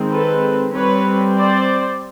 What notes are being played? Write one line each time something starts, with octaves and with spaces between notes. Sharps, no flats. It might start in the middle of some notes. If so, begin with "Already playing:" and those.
Already playing: D#3 G#3 C4
A4 B4
G3 C4 B4 C#5
C5 D5